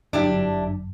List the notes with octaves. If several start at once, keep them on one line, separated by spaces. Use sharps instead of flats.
G1 F#2 D4 E4 G4